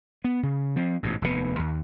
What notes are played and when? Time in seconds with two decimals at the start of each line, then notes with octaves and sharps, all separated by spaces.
0.24 B3
0.43 C#3
0.76 F3 C4
1.03 A1 G#2 B2
1.22 F1 D#2 G#2 B3
1.59 D#2